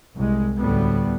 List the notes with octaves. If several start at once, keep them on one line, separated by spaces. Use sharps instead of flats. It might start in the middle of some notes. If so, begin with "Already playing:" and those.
C2 G#3
D2 A2 G3 B3